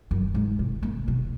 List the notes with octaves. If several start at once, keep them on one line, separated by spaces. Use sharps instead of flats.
F#2
G#2
B2
A#3
B2